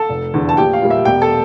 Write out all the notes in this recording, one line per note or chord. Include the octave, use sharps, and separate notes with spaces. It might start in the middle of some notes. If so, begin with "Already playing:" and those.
Already playing: A4 A5
F1
E2 D3
A5
A#1 G4 G5
F5
A#2 G3
E5
E1 G4 G5
A4 A5